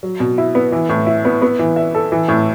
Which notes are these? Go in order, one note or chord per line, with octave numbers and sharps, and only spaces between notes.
F#3
B2
E4
B3
E3
A2
E4
B3
B3
E3
E5
A4
E3
A2